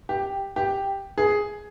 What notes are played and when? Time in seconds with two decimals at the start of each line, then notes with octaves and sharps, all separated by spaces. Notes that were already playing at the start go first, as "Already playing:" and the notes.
0.09 G4
0.56 G4
1.18 G#4